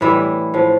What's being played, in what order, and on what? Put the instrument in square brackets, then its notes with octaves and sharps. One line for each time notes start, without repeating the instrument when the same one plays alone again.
[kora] A2 E3 G3 E4
A2 F3